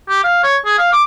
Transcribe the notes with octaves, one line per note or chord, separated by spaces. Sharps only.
G4
F5
C#5
G#4
F5
D6